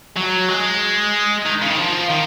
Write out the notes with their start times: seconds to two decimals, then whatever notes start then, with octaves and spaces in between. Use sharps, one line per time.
0.17 F#3
0.49 G#3
1.46 D#3
1.62 C#3
1.70 D#3
1.77 F3
2.10 D#3